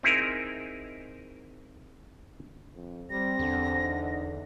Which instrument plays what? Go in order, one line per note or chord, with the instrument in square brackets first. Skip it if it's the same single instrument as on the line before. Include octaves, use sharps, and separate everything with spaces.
[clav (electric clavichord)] C4 D#4 E4 G#4 A#4
[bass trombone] F2
[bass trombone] G3 [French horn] C4 [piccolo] A#6
[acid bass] E2 [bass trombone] D3
[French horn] D#4